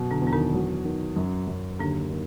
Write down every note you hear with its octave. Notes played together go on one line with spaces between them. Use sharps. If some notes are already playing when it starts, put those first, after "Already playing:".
Already playing: F#2 B2
D3 D4
E2
D4
D#3 D#4
F#3
D#3
F#2
F#2
D#2 D3 D4
D#3